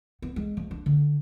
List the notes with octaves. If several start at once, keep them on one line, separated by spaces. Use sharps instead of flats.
B3
G#3
F3
D4
D3